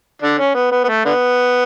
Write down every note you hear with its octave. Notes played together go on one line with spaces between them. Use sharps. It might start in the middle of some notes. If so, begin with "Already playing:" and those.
D3 D4
C#4
B3
B3
B3
A3
D3 B3